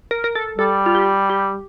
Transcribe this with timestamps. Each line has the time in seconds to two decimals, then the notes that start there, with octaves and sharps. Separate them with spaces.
0.11 A#4
0.24 A#4
0.35 A4
0.58 G3 A4
0.86 F4
0.95 G4
1.30 G4